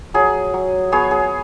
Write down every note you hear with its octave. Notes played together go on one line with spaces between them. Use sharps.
F#3 G#4
F#3
B3 G#4 C#5
G#4